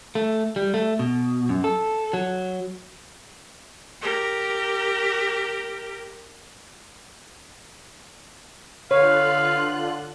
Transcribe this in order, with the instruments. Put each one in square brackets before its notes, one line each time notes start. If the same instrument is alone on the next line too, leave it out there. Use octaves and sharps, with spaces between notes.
[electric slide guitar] A3
G3
A3
B2
F#2
A4
F#3
[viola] G4 A#4
[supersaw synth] D3 F4 F#6 [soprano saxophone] B4 [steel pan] C#5 [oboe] F5